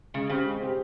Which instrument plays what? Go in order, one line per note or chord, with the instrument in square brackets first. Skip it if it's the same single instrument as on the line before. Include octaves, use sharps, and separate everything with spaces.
[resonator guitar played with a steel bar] C#3 [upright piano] G#3
[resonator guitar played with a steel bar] C#3 [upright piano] C4 G4
[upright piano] G#3
C4 G4